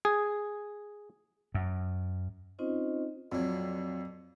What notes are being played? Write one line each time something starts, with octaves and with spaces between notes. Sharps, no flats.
G#4
F#2
C4 C#4 D#4 F4 C5 D#5
F2 A#2 F#3